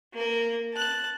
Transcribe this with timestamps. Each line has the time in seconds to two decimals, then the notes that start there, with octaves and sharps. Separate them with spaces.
0.14 A#3 A#4
0.74 A5 F#6